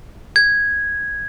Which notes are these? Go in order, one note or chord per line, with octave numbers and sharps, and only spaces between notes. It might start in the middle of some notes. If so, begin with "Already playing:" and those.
G#6